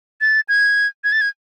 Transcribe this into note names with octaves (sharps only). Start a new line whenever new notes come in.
A6
G#6
G#6
A6
G#6